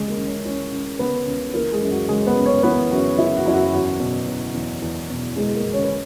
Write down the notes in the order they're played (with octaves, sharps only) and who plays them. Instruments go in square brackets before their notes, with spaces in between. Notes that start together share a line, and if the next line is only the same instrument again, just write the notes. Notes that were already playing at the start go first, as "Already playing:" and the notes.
Already playing: [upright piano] C#2 C#3 E3 G#3 G#4
A#3 A#4
C#2
C#4 C#5
E3 C#4 C#5
C#2
C#3 B3 B4
C#2
E3 A#3 A#4
G#3 G#4
F#2
F#4
C#3 G#3 G#4
B3 B4
F#2
C#4 C#5
E3 B3 B4
F#2 F#4
C#3 E4
F#4
F#2 E4
F#4
E2 F#4
B2
B2
E2
E2
B2
B2 G#3 G#4
A#3 A#4
E2
C#4 C#5
B4